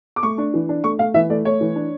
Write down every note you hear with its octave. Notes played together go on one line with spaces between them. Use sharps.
D6
A3 C#6
D4
E3
D4
A3 C#6
A3 F5
E3 E5
A3 D5
A3 C#5
E3
D4